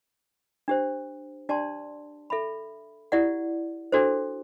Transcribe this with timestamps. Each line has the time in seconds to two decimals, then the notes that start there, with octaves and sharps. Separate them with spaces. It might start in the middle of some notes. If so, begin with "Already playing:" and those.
0.68 D4 G4 C5
1.49 D4 G4 D5 A5 C6
2.30 A4 E5 B5
3.12 E4 G4 D5 F#5
3.92 D4 F#4 A4 C5